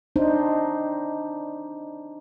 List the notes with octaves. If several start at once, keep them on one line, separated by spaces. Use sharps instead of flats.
C4 D4 D#4 C5